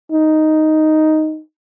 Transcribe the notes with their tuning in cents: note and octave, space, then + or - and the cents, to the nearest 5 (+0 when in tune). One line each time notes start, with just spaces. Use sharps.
D#4 +0